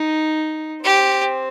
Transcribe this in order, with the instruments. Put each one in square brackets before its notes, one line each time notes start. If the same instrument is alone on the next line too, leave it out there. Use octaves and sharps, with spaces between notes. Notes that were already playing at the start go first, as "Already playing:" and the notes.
Already playing: [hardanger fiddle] D#4
[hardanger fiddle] C4 [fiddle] G4